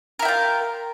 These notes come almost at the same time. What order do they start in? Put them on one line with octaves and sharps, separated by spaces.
A#4 E4 G5 F4